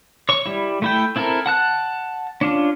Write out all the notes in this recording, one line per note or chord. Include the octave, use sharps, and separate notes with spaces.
C#5 C#6
G3 E4
A3 E4 G5
C4 E4 A4 A#4
F#5 A5 F#6
C#4 D4 F4